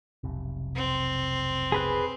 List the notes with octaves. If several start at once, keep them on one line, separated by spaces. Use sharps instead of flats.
F1 B1 C3
C4
G#4 B4 F#6